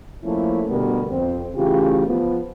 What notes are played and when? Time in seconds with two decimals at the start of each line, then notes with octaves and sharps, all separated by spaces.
0.23 F3 A3 A#3 C#4 E4
0.69 D2 B2 D3 G3 B3 A#4
1.11 F2 C4
1.55 C#3 E3 A3 F4 G4
2.06 F3 B3